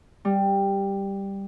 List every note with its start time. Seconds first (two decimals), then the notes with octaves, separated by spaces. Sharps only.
0.25 G3